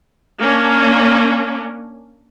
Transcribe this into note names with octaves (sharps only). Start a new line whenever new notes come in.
A#3 C#4 D4